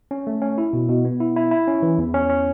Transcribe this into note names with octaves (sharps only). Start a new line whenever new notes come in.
C#4
A3
C#4
E4
B2
B2
B3
E4
E4
E4
C#4
E3
E2
C#4
C#4